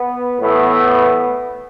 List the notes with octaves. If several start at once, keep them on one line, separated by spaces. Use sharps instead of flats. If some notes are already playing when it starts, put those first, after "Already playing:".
Already playing: B3
A2 E3 A3 B3